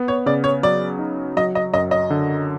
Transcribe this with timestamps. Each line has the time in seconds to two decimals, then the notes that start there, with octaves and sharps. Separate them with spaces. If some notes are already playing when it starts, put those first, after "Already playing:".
Already playing: B3
0.08 C#5
0.26 C#3 D5
0.44 C#5
0.63 F#3 D5
0.99 D#4
1.37 F#3 D#5
1.55 D#5
1.74 F#2 D#5
1.91 D#5
2.10 D3